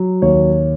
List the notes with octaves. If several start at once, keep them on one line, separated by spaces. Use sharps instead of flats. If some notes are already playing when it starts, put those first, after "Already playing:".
Already playing: F#3
D#2 C#5